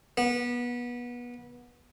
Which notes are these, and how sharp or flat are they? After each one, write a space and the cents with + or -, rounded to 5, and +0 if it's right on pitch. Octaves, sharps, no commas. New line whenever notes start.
B3 -25